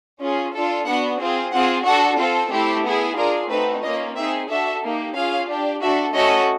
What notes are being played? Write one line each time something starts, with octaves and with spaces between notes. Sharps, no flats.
C#4 F4 G#4
D4 F4 A4
B3 D4 F#4 F#5
C4 F4 G#4
C4 F4 G#4 F#5
D4 F#4 A4 F#5
C4 F4 A4
A3 C4 E4 G4
B3 E4 G#4
D4 F4 G#4 A#4
A3 C4 D#4 F#4 B4
A#3 C#4 F4 D#5
C4 D#4 G#4 E5
D4 F#4 A4 E5
A#3 D#4 G4
C#4 F4 G#4 F5
D4 G4
D4 F#4 A4 E5
A3 C#4 F#4 A4 D#5